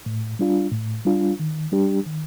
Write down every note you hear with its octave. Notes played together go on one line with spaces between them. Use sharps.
A2
G3 D4 F4
A2
G3 D4 F4
D#3
G3 D4 G4
D#3